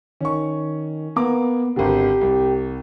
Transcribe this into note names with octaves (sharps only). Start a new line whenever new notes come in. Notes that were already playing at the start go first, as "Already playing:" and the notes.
D#3 C#4 C#6
A#3 B3 A#5 D6
G#1 G#2 D3 G4
C2